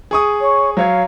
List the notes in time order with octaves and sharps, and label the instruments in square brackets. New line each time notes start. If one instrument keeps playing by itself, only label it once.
[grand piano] G#4 C#6 D#6
[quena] C#5
[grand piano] F#3 C#5 G#6 [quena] F5